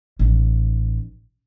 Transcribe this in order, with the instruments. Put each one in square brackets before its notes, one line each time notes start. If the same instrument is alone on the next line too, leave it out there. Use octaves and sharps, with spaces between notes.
[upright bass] A1 D#4